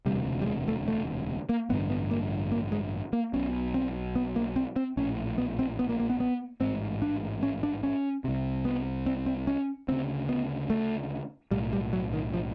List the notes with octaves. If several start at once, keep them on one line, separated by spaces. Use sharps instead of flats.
E1 D2 C3 G3
G3
G#3
A3
A3
A#3
A1 G2 D3 B3
B3
A#3
A#3
G#3
A#3
B1 B2 C#4
C4
B3
A#3
C4
C4
A#1 A2 C#4
B3
C4
B3
A#3
A#3
B3
B3
A1 G#2 C4
D4
C#4
D4
C#4
C2 C3
B3
C4
C4
C#4
D2 C#3 C4
B3
A3
B1 A2 G3
G3
F#3
D#3
F3